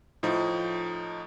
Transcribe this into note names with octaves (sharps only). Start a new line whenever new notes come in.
A2 F3 D#4